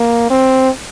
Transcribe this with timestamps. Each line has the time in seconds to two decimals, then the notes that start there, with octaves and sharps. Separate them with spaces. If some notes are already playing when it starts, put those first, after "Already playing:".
Already playing: A#3
0.30 C4